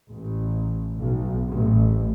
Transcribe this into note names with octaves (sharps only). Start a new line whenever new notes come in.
A1
B1
A1